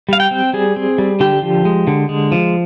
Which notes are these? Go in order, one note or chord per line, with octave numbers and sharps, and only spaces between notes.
G3 F5
G5
C4
G3 G#4
C4
G3
D3 G4
F3
G#3
D3
G#3
F3